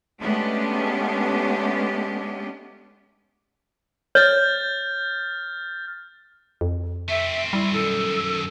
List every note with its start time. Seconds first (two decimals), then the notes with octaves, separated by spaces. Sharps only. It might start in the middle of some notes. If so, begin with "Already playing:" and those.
0.19 G#3 A3 B3 C#4 D4 G4
4.15 C#5 F6 G6 A6
6.61 F2
7.09 A3 C4 E5
7.53 G3 E4
7.73 F#2 D#3 A4